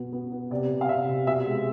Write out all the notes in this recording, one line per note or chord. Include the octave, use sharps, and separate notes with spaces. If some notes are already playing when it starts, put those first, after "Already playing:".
Already playing: B2 B3
B3
B3
C3 D5
C3
F5
C3 E5
C3
B2 E5
G#3